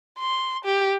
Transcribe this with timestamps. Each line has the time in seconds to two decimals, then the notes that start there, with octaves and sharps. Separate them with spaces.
0.19 C6
0.65 G4